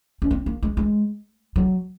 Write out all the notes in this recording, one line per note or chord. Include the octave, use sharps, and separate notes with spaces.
C#4
C4
A#3
G#3
G#3
F#3